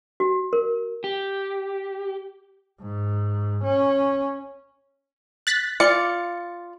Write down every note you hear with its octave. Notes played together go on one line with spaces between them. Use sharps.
F#4
A#4
G4
G#2
C#4
F#6 A6 B6
F4 D5 C#7